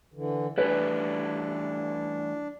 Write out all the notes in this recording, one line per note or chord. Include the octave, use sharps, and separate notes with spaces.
D3 E3
E3 G3 A3 D4 B4